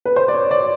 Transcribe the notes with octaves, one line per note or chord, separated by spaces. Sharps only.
B4
C5
D5
C#5
D5